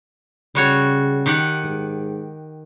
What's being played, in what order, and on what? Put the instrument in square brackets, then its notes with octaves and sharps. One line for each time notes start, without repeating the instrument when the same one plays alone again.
[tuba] C#3 [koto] G3 F#4 C#5
[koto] D#3 G4 F#5
[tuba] G#2